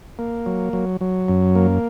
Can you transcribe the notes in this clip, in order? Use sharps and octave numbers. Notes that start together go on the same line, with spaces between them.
A#3
F#3
F#3
F#3
F#2
A#3